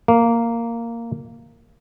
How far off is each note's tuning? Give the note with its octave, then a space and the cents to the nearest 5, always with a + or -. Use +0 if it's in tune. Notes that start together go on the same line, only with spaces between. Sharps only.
A#3 -5